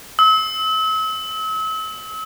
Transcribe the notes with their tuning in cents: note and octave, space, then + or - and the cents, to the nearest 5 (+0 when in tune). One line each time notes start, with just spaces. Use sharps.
E6 -40